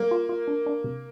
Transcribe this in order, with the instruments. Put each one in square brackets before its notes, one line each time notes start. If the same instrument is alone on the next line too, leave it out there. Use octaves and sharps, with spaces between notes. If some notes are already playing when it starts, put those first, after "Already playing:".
Already playing: [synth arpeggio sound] G3 [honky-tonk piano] A#3
[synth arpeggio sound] F4
F4
D4
D4
C3